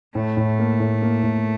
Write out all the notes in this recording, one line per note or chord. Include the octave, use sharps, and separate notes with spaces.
A2 A3
A2
A#3
A2
A#3
A2